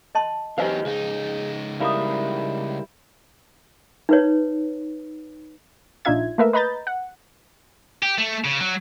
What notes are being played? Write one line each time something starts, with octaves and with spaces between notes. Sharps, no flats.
D#5 A5 C6
E2 F#3 G4 B4 C5 D#5 F5 G#5
C#2 D#4 G#4
G3 E4 A#4 F5 D#6
D#4 B4 C#5
A#1 D4 D#4 F4 E5 G#6
A3 A#3 A#4 B4 E5
B4 D#5 A#5 B5 G6 A6
F#5
G4
A3
C#3
F#3